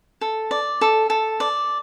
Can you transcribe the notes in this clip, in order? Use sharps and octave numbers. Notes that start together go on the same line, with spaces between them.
A4
D5
A4
A4
D5